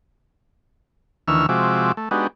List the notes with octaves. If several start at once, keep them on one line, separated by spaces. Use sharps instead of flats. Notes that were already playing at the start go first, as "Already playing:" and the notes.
D2 D#3 E3 C#6 E6 F6
C3 F3 G#3 F#4 E5 D6
A3
G#3 B3 D4 D#4 F#4 G4